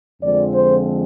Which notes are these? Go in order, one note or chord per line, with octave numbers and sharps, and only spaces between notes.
F2 D3 F3 G#3 C4 D5
C5